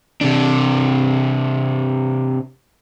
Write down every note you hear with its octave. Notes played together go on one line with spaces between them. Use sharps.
C3 D4